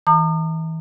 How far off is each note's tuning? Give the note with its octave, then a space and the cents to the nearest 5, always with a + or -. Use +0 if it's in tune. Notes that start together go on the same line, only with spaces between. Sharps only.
E3 -35 A#5 -40 D#6 -45